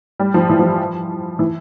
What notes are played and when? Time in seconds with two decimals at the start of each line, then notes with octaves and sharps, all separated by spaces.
0.20 G3
0.34 F3
0.49 E3
0.59 F3
1.39 E3